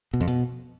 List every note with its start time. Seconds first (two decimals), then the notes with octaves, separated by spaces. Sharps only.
0.14 B2
0.21 F2
0.28 B2